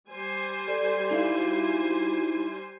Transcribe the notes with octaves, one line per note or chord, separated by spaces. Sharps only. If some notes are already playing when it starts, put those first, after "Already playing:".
G3 C5 G#5
A4 D5
D#4 E4 F5
F#4